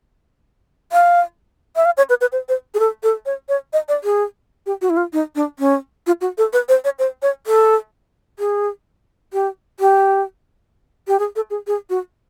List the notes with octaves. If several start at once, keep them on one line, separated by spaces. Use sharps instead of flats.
F5
E5
F5
C#5
B4
B4
C5
C5
G#4
A4
A4
C#5
C#5
D#5
D5
G#4
G4
F#4
E4
F4
D#4
D4
C#4
F4
F#4
A4
B4
C5
C#5
C5
C#5
A4
G#4
G4
G4
G4
G#4
A4
G#4
G#4
F#4